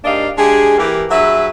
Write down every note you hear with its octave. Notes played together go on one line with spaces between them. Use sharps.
G#2 A#3 D4 G4 D#5 F5
G#3 D4 G4 G#4
E3 A#3 G4
G2 F#3 G#4 B4 E5